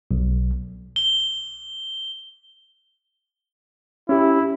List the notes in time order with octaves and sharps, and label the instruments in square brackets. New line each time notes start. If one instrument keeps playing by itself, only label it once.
[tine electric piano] B1
[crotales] G7
[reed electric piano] C#4 G4 [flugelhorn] E4